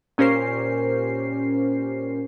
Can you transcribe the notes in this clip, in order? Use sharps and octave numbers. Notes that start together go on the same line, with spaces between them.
A#2 C#4 G4 A#4 C5 C7